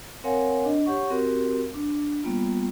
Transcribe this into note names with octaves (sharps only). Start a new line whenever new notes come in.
C4 A#4 C#5 F5 F#5 G#5
D4 D#5
G4 C#5 F#5 C#6
C4 F#4 G4 A#4
D4
G3 A#3 B3 F4